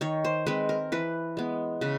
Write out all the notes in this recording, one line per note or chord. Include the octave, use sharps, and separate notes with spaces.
D#3 C#5
C5
G#3 C4 B4
A#4
E3 B4
G#3 B3
C#3 B4